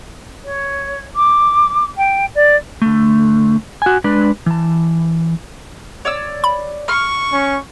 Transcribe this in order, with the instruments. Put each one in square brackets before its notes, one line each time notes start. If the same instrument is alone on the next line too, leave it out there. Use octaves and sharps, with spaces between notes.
[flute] C#5
D6
G5
D5
[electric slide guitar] D3 A3
F#4 G#5
G#3 D4 B4 D5
E3 A5
[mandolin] C#5 D5 E6
[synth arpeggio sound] B5
[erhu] C#6 [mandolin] F6
[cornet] C#4